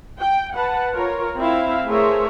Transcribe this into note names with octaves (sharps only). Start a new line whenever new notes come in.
G5
B4 F#5 A5
F4 A#4 C#5
C4 E4 E5 F5
A3 G#4 A#4 C5 C#5 E5